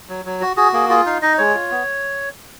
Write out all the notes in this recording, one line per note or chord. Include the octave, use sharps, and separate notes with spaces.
F#3
F#3
F#4
F#4 G#4
A#3 G#4
F4 G#4
D#4 F5
D#4 D#5
G#3 C#5
F4
B3